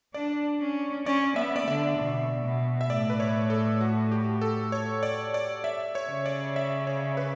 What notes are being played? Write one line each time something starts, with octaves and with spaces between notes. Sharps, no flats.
D4 D5
C#4
C#4 D5
B3 E5
D5
D3 E5
B2
B2
E5
A2 D5
B4
C#5
A4
F#4
G4
A4
C#5
D5
D5
E5
C#5
C#3
D5
E5
C#5
B4